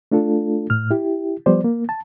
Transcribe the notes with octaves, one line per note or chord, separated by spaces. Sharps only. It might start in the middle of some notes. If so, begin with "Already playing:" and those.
A3 D4 F4 A4
A2 F6
E4 G4
F3 G3 B3 C5 D5
A#3
A5